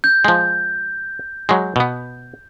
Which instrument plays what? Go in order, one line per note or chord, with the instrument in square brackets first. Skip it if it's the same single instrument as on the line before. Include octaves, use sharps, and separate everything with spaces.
[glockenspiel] G6
[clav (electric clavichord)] F3 G#3
F#3 G#3
B2 B3